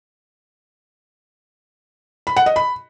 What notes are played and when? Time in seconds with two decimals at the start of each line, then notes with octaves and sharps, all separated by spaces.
2.27 B5
2.37 F#5
2.46 D#5
2.56 B5